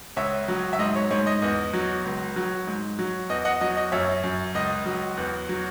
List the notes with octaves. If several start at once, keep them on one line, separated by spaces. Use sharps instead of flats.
C#2 C#5 E5
F#3
E5
G#2 D#5
C#5
G#2 C#5
D#5
E2 D#5
F#3
C#2
F#3
G#2
F#3
E2 D#5
D#5 F#5
F#3 D#5
D#5
F#2 C#5 E5
F#2
C#2 D#5
F#3
E2
F#3